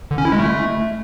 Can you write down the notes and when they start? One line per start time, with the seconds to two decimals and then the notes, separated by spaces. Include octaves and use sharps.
0.11 D3
0.18 C#4
0.25 E4
0.32 G#3
0.39 A3